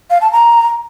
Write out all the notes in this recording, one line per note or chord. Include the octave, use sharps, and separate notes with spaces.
F5
A5
A#5